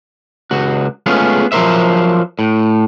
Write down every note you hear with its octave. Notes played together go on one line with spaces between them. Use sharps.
C#2 F#4
G#3 A3 B3 C#4 F4 G#4
F3 F#3 B3 A#4 C5 E5
A2